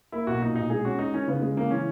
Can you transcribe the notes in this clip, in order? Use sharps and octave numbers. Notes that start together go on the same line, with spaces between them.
A#3 E4
B1 F#4
A#2 D#4
B1 D#4
G#3 G#4
C#4 F#4
G#3 D#4
D#3 C#4
C#3 B3
G#3
C#3 A#3
E3 C#4